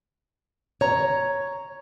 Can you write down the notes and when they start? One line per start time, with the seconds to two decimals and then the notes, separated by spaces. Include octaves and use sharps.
0.81 C#5 A#5